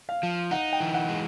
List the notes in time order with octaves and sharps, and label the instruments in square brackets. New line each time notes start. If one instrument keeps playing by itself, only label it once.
[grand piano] F5
[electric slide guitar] F3
[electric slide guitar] D#4 [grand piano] F#5
[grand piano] G5
[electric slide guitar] E3
[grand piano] F#5
[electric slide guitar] G#3